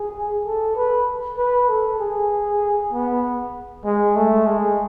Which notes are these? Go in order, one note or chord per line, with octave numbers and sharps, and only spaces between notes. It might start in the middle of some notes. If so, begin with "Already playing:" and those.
Already playing: G#4
A4
B4
B4
A4
G#4
B3
G#3
A3
G#3